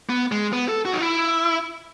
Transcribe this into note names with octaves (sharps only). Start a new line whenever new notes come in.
B3
G#3
B3
A4
F#4
D#4
E4